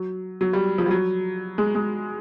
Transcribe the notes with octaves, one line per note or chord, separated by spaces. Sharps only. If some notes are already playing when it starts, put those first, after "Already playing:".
Already playing: F#3
F#3
G3
F3
G3
F#3
G#3
G#3